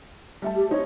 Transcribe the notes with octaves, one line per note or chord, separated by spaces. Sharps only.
G3 A3 A5
G4
C4 D#4 E4 C#5